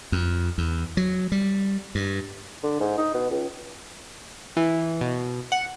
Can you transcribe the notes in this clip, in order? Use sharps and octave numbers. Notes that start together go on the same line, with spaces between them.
F2
E2
F#3
G3
G2
D3
G#2
D#4
B2
C#2
E3
B2
F#5